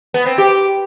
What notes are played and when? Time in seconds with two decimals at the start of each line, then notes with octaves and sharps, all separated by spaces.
0.14 B3
0.26 C4
0.38 G4